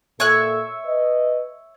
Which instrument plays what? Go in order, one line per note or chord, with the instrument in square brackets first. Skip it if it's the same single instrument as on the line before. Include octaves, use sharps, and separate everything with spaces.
[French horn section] A#2 A4 [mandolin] C#5 E5 F#6
[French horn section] B4 D#5